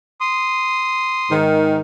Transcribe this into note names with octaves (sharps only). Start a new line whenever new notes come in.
C6 D#6
G#2 D#3